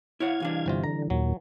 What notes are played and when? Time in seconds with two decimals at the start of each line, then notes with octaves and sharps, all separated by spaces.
0.20 E4 C#5 F5 F#5 G#6
0.40 C2 E3 D4
0.66 G1 C3 F4
0.84 D3 A#5
1.10 D#2 A#2 F#3